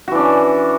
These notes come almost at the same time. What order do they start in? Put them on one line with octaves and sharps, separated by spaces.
F#4 E3 D4 C#4